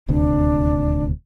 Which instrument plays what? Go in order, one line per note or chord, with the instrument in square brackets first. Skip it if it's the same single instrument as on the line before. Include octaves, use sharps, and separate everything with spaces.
[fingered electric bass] D#1 D2 C3 [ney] D4